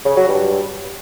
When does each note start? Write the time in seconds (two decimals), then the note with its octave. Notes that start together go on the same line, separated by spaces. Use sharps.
0.05 C#3
0.17 F#3
0.29 G2